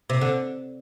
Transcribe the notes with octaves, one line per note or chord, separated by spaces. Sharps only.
C3
D3